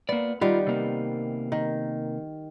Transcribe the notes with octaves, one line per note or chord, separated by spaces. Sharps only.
A#3 B3 D5
D#3 G3 B3 F4
C3 A#3
D#3